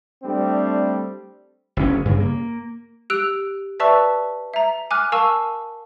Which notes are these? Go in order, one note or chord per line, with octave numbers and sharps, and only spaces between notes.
G3 A3 C4 D4
F#1 D2 C#4
G2 C#3
A#3
G4 E6 F#6 D7 F7
B4 D5 E5 A5 C#6 E6
E5 A#5
G#5 D6 F6 F#6
A#4 F5 G#5 A5 C#6 E6